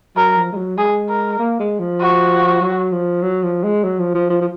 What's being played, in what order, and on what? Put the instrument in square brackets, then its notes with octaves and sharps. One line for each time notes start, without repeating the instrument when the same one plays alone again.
[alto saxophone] F#3 [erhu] A#4
[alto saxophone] F3
G#3
F#3
[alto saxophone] G#3 [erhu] G#4
[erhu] A#4
[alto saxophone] A#3
G#3
F3
[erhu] F#4
[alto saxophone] F#3
F3
F#3
F3
G#3
F#3
F3
F3
F3
F3